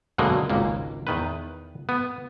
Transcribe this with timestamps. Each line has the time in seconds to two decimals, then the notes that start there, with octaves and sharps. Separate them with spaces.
0.18 F#2 B2 D3 F#3 G#3 A#3
0.50 G#1 C#2 A#3
1.07 E2 D#3 B4
1.89 B3